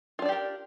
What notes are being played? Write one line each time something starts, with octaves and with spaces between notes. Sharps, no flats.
D4 F4 G4 A#4 D5